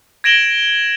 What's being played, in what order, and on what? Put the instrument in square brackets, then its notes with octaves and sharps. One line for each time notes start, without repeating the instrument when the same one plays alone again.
[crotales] G#6 A#6 D7 E7 F#7 G7